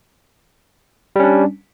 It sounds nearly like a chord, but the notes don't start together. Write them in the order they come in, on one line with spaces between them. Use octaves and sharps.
G3 C#4 D4